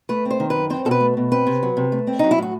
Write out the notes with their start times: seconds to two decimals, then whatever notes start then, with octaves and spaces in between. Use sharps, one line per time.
0.09 A3 B4
0.25 C4
0.31 C5
0.40 D#3
0.50 B4
0.56 F#2
0.70 C4 C5
0.85 B2 A4
0.91 B4
1.01 A3
1.17 B2
1.32 C4 B4
1.47 C3
1.63 F#3
1.77 C3
1.92 A3
2.07 C4
2.19 F#3 D#4
2.31 E4
2.39 A2 F#4